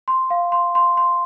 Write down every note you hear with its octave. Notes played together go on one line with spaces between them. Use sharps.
C6
F5
C6
C6
C6